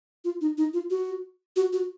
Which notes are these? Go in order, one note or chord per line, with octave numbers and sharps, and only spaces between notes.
F4
D#4
D#4
F4
F#4
F#4
F#4